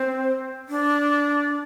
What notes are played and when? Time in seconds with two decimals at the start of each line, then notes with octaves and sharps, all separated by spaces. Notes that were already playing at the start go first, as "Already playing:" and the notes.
Already playing: C4
0.69 D4